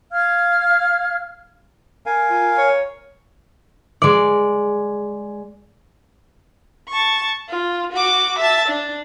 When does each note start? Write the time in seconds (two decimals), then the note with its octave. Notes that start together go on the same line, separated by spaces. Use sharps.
0.12 F5 F6 G#6
2.06 A#4 F5 G#5
2.30 F4
2.58 C#5
4.02 G#3 D5
6.89 A5 C#6
7.49 F4
7.92 F#4 D6
8.38 E5 A5
8.68 D4